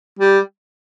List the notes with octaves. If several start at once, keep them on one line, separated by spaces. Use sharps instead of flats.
G3